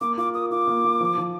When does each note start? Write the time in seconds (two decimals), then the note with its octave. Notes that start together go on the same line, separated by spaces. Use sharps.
0.01 A#3 D6
0.17 F4 D6
0.34 A#4 D#6
0.51 F4 D6
0.68 A#3
0.84 A#3
1.01 F3
1.18 F3